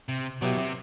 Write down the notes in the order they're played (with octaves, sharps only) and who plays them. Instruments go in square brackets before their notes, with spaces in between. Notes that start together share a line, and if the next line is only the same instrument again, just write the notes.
[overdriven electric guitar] C3
[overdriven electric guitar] B2 [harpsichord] F#3 B3 E4 G4 B4
[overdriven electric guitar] C3